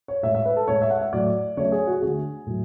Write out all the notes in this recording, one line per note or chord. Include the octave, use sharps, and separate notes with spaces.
C#5
A2 G#3 E5
E5
B4
A4
A2 G#3 C#5
E5
F#5
E5
A2 F#3 A3 D5
C#3 F#3 A3 C#5
G#4
F#4
D3 A3 G#4
A2 F#3